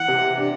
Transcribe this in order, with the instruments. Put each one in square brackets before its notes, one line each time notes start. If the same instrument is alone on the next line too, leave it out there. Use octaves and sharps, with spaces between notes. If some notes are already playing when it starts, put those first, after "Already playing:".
Already playing: [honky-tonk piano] E3 [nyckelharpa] F#5
[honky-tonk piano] C3
D4